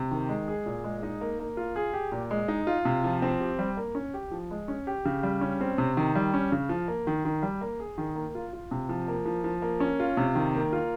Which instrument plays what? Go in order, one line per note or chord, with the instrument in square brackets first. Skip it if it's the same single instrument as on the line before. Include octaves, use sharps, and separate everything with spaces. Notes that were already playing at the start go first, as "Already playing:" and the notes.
Already playing: [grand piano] C3
D#3
G#3
G#4
A#2
G#3
D#4
A#3
A#3
F4
G#4
G4
A#2
G#3
D#4
F4
C3
F3
C4
G4
G3
A#3
C#4
G4
F3
G#3
C#4
G4
C#3
G3
C#4
C4
C3
D#3
G3
C#4
C#3
F3
A#3
D#3
D#3
G3
A#3
G#4
D#3
A#3
F4
F4
C3
F3
A#3
F3
F3
A#3
C#4
F4
C3
D#3
A#3
F4